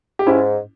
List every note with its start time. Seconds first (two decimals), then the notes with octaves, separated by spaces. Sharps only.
0.19 G4
0.27 G#2 C#4 E4